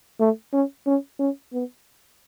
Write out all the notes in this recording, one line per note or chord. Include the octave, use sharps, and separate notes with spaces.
A3
C#4
C#4
C#4
B3